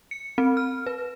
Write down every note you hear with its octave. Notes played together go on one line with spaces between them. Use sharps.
C#7
C4
F6
B4